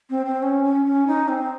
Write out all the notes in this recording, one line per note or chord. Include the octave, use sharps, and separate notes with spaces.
C4
C4
C#4
C#4
C#4
D#4
C4